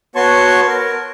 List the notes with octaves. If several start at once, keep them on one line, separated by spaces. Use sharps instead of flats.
B3 F#4 C#5 A5 C6 C#6
A#4